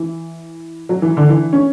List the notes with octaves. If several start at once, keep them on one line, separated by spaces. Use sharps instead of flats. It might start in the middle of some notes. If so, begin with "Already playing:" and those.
Already playing: E3
F#3
E3
D3
E3
C#4